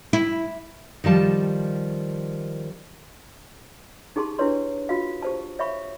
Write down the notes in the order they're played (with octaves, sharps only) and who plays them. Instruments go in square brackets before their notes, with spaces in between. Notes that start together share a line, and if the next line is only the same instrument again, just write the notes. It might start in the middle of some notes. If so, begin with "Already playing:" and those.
[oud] E4
[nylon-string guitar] D#3 F3 G3 A5
[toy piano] D#4 G4 G#4 A5 C6
D4 E4 G4 B4 C#5 C6
F4 F#4 F5
G4 C5 A5
C#5 E5 F5 B5 C#6